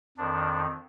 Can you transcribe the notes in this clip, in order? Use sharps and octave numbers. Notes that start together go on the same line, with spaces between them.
F2 D#3 D4